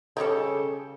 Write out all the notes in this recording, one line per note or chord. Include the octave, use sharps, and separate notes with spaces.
C#3 G3 A4 C#5 D#5 G5